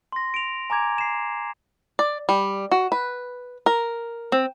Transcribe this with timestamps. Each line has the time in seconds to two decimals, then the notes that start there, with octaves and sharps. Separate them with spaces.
0.12 C6 A#6
0.34 D7 F7
0.70 G#5 A#5 D6 G#6 F7
0.98 C7 E7
1.99 D5
2.29 G3
2.71 F#4
2.92 B4
3.66 A#4
4.32 C4